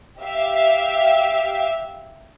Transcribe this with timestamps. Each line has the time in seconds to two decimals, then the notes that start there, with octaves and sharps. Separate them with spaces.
0.22 G4 E5 F5